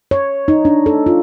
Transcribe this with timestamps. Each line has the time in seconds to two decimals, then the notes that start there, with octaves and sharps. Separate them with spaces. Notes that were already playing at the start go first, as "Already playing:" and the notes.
0.11 C#5
0.48 D#4
0.65 D4
0.86 A4
1.06 F4